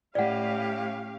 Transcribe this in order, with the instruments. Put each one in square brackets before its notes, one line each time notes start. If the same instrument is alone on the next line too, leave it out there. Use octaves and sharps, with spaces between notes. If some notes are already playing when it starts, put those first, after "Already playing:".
[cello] A2 [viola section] C#4 F5 [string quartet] G4 [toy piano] D5 F#5